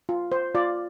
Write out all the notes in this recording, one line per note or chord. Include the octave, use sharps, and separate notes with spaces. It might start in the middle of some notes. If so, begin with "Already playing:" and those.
F4
C5
F4 D5